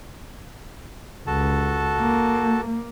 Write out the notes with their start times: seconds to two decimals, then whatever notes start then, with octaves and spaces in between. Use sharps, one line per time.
1.27 C#2 F#4 A4 A5
1.99 A#3